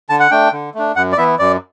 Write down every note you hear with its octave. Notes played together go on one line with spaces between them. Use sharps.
D3 A5
F#5
A3 D4 G5
D3
A3 D4
F#2 F#5
D5
E3 B3 E4 E5
F#2 D5